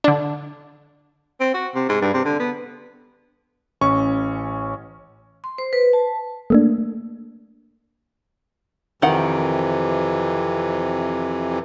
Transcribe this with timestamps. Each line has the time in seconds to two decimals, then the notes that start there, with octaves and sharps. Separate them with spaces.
0.04 D3 D4
1.40 C4
1.54 F#4
1.75 C3
1.89 G#2
2.02 G2
2.14 C3
2.25 D3
2.40 B3
3.81 A1 C#4 C#6
5.44 C6
5.58 C5
5.73 B4
5.93 A5
6.50 A3 A#3 D4
9.02 F2 C3 D#3 E3 F#5